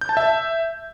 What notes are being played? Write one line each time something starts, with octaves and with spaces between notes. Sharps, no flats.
G6
A5
E5